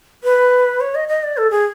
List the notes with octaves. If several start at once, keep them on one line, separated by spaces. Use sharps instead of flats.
B4
C#5
D#5
D#5
D5
A4
G#4